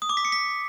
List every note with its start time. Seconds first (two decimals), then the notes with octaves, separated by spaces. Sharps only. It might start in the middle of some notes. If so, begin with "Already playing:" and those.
0.02 D#6
0.09 D6
0.17 B6
0.25 C#7
0.32 B6